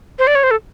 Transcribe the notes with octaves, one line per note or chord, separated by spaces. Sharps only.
C5
D5
C#5
C5
A4